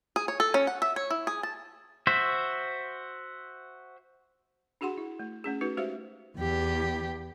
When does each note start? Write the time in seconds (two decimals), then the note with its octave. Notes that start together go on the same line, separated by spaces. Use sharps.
0.16 G#4
0.28 C#5
0.40 A4
0.54 C#4
0.67 F#5
0.82 E5
0.96 C#5
1.11 E4
1.27 G#4
1.43 A5
2.07 F#4 C5 E5
4.81 D4 F#4 G#4 F#5 C6
4.98 E4
5.19 A3
5.44 A3 C#4 G#4
5.61 A3 D#4 F#4 B4
5.77 G#3 F#4 G4 C5 E5 F5
6.36 E2 G4